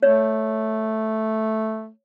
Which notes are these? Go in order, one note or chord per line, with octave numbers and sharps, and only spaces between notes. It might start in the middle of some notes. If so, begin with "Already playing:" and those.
A3 C#5